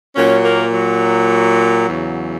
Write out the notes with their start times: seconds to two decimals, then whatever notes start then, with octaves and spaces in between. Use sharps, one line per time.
0.15 A#2 F#3 C#4
0.45 A#3
0.73 F#3
1.88 E2 C#3 F#3